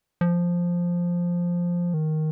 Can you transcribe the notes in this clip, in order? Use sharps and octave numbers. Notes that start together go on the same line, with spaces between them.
F3
D#3